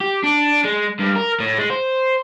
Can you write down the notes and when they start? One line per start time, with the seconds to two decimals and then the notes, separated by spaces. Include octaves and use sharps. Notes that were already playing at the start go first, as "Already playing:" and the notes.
0.01 G4
0.23 D4
0.65 G#3
0.99 G2
1.16 A#4
1.40 A2
1.59 G#3
1.70 C5